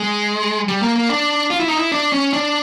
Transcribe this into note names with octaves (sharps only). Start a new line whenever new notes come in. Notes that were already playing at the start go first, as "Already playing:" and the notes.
Already playing: G#3
G3
A#3
A#3
D4
F4
E4
D#4
E4
D4
C#4
D4